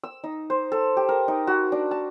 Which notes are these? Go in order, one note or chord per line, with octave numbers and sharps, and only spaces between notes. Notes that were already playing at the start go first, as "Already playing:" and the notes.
E6
D#4
C5
A4
G4
A#4
D#4
F#4
D4
A5